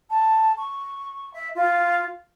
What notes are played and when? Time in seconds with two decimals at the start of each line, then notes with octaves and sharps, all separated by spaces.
0.10 A5
0.58 C#6
1.33 E5
1.55 F4